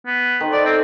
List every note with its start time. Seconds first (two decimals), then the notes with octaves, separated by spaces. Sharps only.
0.06 B3
0.41 D#3 C5
0.52 A4 D5
0.66 C4